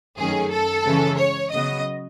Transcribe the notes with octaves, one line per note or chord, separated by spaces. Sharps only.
F#2 D#3 A3 C#4 G#4
A4
C#3 E3 G#3 C#4
C#5
C#3 F#3 B3 D#5